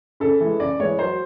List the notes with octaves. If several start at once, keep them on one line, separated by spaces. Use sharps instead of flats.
C#3 A4
E3 G#3
C#3 D5
E3 G#3 C#5
F#3 C5